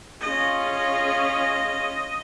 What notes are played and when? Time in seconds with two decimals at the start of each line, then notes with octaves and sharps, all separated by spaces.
0.21 C#4 F4 G#4 D#5